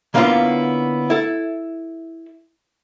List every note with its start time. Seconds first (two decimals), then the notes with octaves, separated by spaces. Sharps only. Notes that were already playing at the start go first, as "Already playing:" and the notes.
0.14 D3 A#3 B3 C#4 E4 F4
1.10 E4 A4